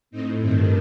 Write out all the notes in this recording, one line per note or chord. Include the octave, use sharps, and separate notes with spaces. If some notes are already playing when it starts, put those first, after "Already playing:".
A2 C4 D#4
G2 D#3 A3 C4